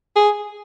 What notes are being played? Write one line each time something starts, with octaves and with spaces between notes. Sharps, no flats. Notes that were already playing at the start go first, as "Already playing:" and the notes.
G#4